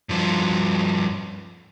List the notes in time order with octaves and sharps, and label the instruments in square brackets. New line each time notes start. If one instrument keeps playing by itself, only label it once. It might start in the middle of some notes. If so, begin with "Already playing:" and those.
[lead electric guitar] G2 F3